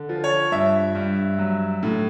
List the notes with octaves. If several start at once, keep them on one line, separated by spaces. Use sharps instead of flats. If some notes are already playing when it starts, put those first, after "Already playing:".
Already playing: D3
F3
C#5
G2 E5
G2
F#3
A2